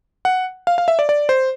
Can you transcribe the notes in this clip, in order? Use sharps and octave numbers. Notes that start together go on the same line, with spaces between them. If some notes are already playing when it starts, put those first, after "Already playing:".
F#5
F5
F5
E5
D5
D5
C5